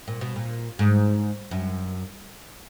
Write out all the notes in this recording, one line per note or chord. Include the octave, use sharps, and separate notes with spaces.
A#2
B2
A#2
G#2
F#2